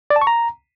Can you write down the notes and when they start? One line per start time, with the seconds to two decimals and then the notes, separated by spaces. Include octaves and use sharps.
0.10 D5
0.16 A5
0.22 C#6
0.27 A#5